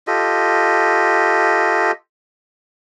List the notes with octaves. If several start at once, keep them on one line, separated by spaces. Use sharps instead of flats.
F4 G4 A4 D#5